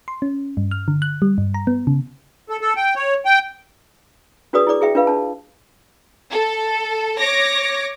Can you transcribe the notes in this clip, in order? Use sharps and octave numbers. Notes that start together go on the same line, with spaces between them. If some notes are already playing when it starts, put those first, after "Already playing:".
C6
C#4
G2
F6
D3
F#6
G3
G2
A#5
B3
C#3
A4
A4
G5
C#5
G5
D4 F#4 G#4 B4 D5 D#6
E4 G#4 D5 D6
E4 G#4 E5 G5
D4 F4 B4 F5
D4 A5
A4
C#5 D6 A#6